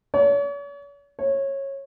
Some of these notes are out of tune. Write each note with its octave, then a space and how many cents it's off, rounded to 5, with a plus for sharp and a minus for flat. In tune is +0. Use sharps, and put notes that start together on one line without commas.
C#5 +40
C#5 -20